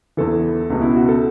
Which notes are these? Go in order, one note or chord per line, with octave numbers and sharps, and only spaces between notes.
E2 E3 A4
C#2 B2
E4
F#4
A4